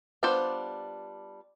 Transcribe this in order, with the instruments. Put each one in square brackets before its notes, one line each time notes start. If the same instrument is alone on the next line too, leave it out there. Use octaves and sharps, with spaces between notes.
[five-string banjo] G3 B3 D4 F4 C5 D5